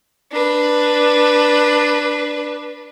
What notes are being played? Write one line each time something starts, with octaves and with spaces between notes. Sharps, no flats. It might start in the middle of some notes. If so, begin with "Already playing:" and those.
D4 B4